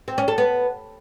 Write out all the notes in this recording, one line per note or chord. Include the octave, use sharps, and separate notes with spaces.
C4
C#4
A4
B3